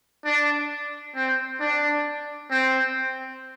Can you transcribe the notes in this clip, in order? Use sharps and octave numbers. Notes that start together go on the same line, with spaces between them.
D4
C4
D4
C4